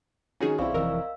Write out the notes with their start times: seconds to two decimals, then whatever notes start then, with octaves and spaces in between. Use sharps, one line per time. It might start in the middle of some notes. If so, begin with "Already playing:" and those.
0.40 D#3 C#4 D#4 F#4 G#4
0.58 B1 C4 E4 D5 F5 C#6
0.74 F1 F2 E3 A#4 D#5 F5 E6